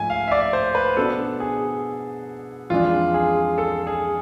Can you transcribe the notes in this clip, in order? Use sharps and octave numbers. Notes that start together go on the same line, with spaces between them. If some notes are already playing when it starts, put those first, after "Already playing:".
Already playing: G#2 F3 A3 G#5
F5
E5
D5
C5
B4
B2 B3 D4 A4
G#4
F2 E3 G#3 D4 F4
G#4
A4
G#4